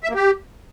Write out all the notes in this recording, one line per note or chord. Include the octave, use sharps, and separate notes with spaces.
E5
A#3
G4